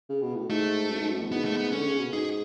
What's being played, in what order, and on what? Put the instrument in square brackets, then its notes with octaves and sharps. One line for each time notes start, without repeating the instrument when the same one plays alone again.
[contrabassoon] C#3
B2
A2
[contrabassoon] G#2 [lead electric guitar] A3
[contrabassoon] F#2
G#2
F#2
E2
[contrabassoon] G#2 [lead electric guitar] B3
[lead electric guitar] A3
B3
[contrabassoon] D3 [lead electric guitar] C#4
[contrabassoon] C#3
B2
[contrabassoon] G#2 [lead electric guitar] G#4